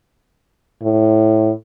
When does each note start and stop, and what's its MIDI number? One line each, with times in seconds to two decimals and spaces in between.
0.83 1.51 45